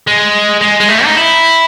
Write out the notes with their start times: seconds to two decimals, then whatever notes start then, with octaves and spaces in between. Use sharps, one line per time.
0.07 G#3
0.61 G#3
0.80 G#3
0.88 A3
1.05 D#4
1.16 E4